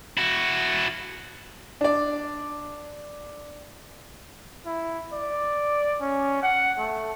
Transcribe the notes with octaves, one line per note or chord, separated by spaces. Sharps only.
E4 F#4
D4 D5
E4
D5
C#4
F#5
A3